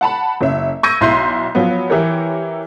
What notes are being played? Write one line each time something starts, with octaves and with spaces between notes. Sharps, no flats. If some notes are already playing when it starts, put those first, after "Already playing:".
F#5 A5 B5
F#1 C#4 E5
C#6 E6 G6 G#6 A#6 D#7
B1 E4 C6 G6 C7
F3 F#3 B3
E3 E4 G4 A#4 C#5